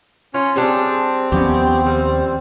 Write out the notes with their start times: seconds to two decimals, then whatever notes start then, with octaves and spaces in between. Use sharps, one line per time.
0.34 C#4 F4
0.56 G3 C4 D4 G#4
1.32 D#2 F3 B3 C#4 G4
1.86 G3